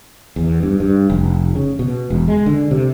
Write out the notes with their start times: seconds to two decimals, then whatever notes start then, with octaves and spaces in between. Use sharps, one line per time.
0.36 E2
0.63 G2
0.80 G2
1.10 F1
1.55 C#3
1.79 B2
2.10 E1
2.28 G#3
2.46 D3
2.71 C3